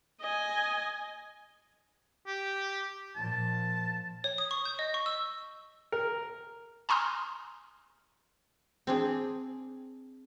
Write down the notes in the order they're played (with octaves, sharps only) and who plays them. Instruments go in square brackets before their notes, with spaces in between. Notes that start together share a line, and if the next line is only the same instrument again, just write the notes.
[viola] D#5 G#5
[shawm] G4
[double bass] A#2 F3 [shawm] A5
[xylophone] C#5
D#6
C#6
G6
D#5
C#6
E6
[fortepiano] A#4
[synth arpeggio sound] G#5 A#5 C6 D#6 F6
[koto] C4 D4 G#4